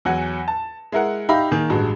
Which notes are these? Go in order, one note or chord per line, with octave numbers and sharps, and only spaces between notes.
E2 F#3 F#5 G#5
A5
G#3 E4 A#4 F#5
D#4 G4 E5 F5 B5
D#3 A#3 G#4
A1 G2 G#3 F#4